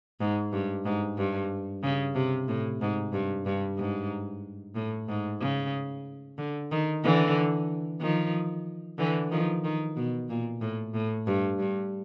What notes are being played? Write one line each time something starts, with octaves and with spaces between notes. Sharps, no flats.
G#2
G2
G#2
G2
C#3
C3
A2
G#2
G2
G2
G#2
A2
G#2
C#3
D3
D#3
D3 E3
D#3 F3
D3 E3
D#3 F3
D#3
B2
A#2
A2
A2
G2
G2